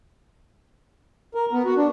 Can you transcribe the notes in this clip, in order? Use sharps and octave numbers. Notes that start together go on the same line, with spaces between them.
A#4
B3
F#4
D4